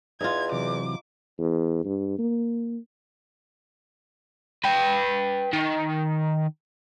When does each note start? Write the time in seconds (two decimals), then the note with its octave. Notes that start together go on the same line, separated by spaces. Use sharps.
0.21 E2 D#4 F4 G#6
0.52 C3 E3 F#3 D6
1.39 E2
1.85 G2
2.19 A#3
4.64 B4 G5
5.53 D#3